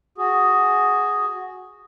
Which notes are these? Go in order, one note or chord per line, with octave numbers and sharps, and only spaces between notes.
F#4 G#4